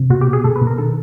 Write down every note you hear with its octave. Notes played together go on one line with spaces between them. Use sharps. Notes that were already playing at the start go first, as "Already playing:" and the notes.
Already playing: C3
B2 F#4
G4
B2
G#4
B2 A4
B4
B2
A#4
D#3 A4